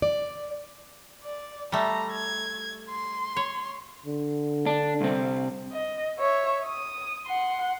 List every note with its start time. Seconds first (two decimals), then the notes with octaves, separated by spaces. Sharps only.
0.02 D5
1.24 D5
1.72 G3 A3 A#5
2.12 G#6
2.89 C6
3.37 C#5
4.06 D3
4.66 D4
5.01 C2 C4
5.72 D#5
6.19 C#5 E5
6.65 D#6
7.26 F#5 C6